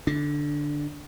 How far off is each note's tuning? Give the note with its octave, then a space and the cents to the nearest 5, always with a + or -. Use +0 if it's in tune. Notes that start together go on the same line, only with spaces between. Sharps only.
D3 +0 D4 +0